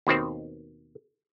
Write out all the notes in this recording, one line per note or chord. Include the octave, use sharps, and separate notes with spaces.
D#2 B2 D#3 C4